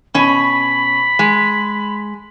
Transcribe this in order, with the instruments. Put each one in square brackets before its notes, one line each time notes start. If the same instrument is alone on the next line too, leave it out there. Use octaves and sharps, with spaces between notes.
[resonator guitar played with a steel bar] B2 C#4 [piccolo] B5
[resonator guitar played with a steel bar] G#3